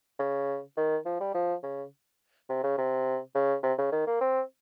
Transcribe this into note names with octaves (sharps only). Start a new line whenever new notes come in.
C#3
D#3
F3
G3
F3
C#3
C3
C#3
C3
C#3
C3
C#3
D#3
A#3
C4